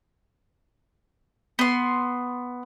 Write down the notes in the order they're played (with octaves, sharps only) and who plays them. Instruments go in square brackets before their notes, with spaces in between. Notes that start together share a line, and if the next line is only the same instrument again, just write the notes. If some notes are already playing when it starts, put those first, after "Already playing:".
[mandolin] B3 C6